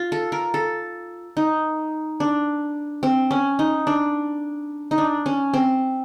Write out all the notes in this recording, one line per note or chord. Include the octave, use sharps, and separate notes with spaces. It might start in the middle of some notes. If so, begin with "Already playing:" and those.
Already playing: F4
A4
A#4
A4
D#4
D4
C4
C#4
D#4
D4
D#4
D4
C#4
C4